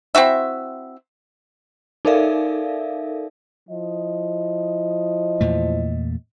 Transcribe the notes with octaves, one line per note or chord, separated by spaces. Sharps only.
C4 E4 F#4 E5
D#4 A4 A#4 D5 E5 F5
F3 E4 D#5
E2 A#2 A3